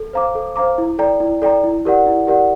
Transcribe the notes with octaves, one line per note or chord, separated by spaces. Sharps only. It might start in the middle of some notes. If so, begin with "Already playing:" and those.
Already playing: A4
C5 F5 A#5 D6
A4
C5 F5 A#5 D6
E4
A4 D5 G5 A#5
E4
A4 D5 G5 A#5
E4
G4 A#4 D5 F#5
E4
G4 A#4 D5 F#5